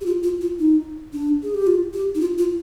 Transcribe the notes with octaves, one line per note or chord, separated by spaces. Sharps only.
G4
F4
F4
F4
D#4
D4
G#4
G4
F4
G4
D#4
F4
F4